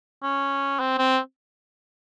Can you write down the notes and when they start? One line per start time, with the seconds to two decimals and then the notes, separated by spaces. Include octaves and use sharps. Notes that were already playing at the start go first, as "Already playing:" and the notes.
0.23 C#4
0.80 C4
0.99 C4